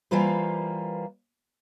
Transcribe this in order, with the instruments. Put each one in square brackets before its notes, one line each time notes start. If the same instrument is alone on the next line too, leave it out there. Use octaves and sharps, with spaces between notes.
[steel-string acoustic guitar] E3 G3 A#3 F4 B4 C5